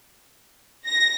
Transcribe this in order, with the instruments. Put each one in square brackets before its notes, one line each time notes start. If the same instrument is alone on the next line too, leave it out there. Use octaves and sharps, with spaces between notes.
[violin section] A#6